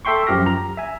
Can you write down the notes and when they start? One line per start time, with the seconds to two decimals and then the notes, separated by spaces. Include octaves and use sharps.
0.05 A4 E5 G5 C6 C#6
0.27 F#2 F3 G4 F6 A#6
0.46 A#5
0.77 E5 G#5